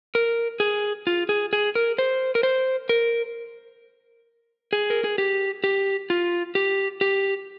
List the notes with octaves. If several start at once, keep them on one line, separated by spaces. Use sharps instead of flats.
A#4
G#4
F4
G#4
G#4
A#4
C5
A#4
C5
A#4
G#4
A#4
G#4
G4
G4
F4
G4
G4